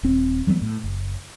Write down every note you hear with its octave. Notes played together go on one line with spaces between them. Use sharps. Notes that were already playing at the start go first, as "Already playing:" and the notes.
D#1 C4
E3 F#3 G#3 B3
A2
F#1